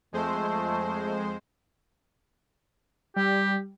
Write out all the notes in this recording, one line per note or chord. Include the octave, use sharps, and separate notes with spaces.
F2 G#3 A3 C5
G3 G4